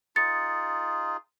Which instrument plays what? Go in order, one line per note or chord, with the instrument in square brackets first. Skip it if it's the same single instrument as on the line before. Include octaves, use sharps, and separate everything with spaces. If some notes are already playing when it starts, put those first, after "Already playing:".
[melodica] D#4 F4 G#4 [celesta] A6 C#7